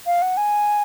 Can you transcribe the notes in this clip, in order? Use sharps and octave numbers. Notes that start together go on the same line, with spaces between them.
F5
F#5
G#5